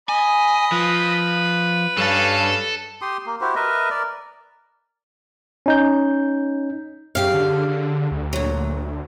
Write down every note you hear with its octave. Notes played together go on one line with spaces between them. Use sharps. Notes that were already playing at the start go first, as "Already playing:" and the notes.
D#5 G#5 B5
F3 B4
G2 C#4 A4 F5 A5
G4 C6 D#6
A#3
E4 F#4 G4 C5
A#4 B4 D#5 E5
A#4 D5
C#4 D#4 G6
F#2 C#3 G4 F5
D3
D3
D2
A#2 F#3